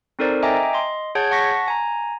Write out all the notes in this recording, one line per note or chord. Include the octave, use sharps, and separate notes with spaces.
C4 D#4 A4 A#4 C5 D5
D#5 E5 G5 G#5 A#5 D6
D#5 C6
G#4 C#5 F#5 A5 G6 G#6
F#5 A5 C#6 A#6 B6
G#5 A#5